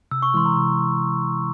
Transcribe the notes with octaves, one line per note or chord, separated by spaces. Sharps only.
C3 E6
C#6
E3 G#3 E4 C6
A#5
C3 C6